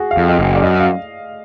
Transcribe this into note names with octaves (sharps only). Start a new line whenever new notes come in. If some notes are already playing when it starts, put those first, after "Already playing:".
Already playing: F#4 G#4
F5
F2
D#5
F#1
D5
F#2 D#5
F5